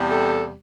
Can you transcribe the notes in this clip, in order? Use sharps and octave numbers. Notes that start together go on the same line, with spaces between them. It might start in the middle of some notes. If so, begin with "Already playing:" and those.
Already playing: E2 C3 G3
A4